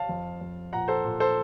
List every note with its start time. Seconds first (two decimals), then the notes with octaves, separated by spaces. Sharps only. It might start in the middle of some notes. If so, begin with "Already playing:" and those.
Already playing: F5 A5
0.09 F2
0.41 F2
0.73 A#2 F#5 A#5
0.88 A4 C5
1.04 A#2
1.20 A4 C5